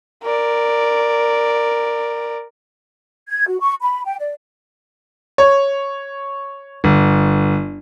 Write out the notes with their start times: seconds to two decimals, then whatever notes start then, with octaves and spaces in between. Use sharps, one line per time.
0.23 A#4 D5
3.29 G#6
3.48 F#4
3.60 C#6
3.82 B5
4.05 G5
4.20 D5
5.38 C#5
6.84 G1